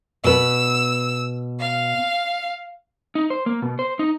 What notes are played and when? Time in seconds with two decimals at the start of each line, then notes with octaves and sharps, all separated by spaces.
0.24 B2 B4 E6
1.60 F5
3.15 D#4
3.30 C5
3.46 A#3
3.62 B2
3.79 C5
3.99 D#4